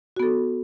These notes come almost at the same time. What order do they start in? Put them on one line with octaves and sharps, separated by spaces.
F#4 B3 A4